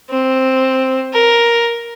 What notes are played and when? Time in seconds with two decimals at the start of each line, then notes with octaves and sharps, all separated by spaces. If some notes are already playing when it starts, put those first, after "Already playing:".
0.10 C4
1.14 A#4